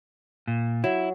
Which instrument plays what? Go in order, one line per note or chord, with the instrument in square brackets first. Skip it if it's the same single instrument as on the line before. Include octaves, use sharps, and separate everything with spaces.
[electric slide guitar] A#2
[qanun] F#3 [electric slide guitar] E4